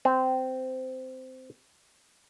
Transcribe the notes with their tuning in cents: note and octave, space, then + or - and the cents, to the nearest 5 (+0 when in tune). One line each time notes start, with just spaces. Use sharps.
C4 -15